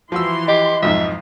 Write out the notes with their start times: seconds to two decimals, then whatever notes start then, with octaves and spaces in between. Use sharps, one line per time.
0.12 E3 F3 F#4 C6 E6
0.48 G4 D#5
0.82 B1 F2 G#2 E5